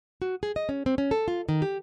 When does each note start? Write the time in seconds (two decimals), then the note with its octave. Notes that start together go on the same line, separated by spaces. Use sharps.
0.22 F#4
0.43 G#4
0.56 D#5
0.69 C#4
0.86 C4
0.98 C#4
1.11 A4
1.28 F4
1.49 D#3
1.62 G4